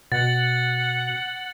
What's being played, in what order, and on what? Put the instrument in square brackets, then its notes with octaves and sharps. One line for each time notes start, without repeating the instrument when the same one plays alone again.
[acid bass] B2 [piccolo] F#5 [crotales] A6